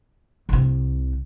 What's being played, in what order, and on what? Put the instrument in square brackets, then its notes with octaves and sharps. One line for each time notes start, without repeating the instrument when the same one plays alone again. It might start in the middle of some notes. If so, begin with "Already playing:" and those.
[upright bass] C2 C3